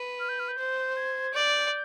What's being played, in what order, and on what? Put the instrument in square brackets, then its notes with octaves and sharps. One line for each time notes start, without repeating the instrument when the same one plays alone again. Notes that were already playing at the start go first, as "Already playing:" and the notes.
Already playing: [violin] B4
[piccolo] F6
G6
F6
G6
[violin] C5
[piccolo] G#6
[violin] D5 [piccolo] G6